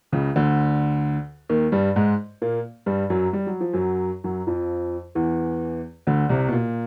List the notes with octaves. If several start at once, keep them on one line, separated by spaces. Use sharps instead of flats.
C#2 C#3
D2 D3
D#2 D#3
G2 G3
G#2 G#3
A#2 A#3
G2 G3
F#2 F#3
G3
F#3
F3
F#2 F#3
F#2 F#3
F2 F3
E2 E3
D2 D3
C2 C3
B2
A#2